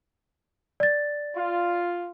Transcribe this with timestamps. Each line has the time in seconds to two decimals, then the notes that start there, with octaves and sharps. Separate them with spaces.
0.80 D5 A6
1.35 F4